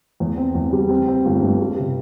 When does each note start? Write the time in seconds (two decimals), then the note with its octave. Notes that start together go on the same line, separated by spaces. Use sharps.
0.20 E2
0.37 C4
0.55 E2
0.73 G3
0.89 C4
1.07 C4
1.25 G1
1.42 G2
1.61 G3
1.78 C3